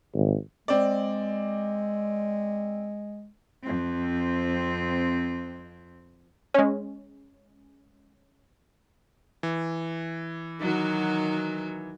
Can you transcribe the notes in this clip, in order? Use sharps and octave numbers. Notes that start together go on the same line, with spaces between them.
G#1
G#3 C4 D5
F2 C4
G#3 C#4
E3
D#3 F#3 F#4